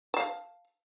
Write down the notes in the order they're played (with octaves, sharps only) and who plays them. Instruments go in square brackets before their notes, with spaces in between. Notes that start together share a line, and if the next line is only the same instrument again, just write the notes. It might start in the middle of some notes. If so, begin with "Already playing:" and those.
[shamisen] F5 A5